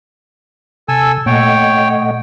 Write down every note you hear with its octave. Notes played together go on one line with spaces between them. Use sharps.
C3 A4 G#5 E6
A#2 A3 C#5 D#5 F#5 G5